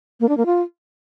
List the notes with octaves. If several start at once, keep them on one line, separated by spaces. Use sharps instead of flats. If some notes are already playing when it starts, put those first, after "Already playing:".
A#3
D4
A#3
F4